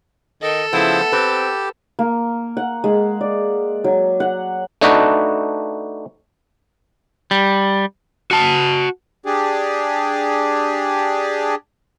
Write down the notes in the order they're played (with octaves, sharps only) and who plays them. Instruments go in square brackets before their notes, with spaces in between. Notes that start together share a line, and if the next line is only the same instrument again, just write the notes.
[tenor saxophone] D#3 [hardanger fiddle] A4 [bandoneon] D#5
[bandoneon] C#3 F3 C5 [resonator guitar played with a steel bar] A3 B3 [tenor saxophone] E4
[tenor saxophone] C4 [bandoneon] G4 [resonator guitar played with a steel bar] B4
[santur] A#3
F#5
G#3
D5
F#3
F#5
[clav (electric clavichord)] A3 D4 D#4 F#4 B4
[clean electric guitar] G3
[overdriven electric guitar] F#4 A5
[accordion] D4 G4 G#4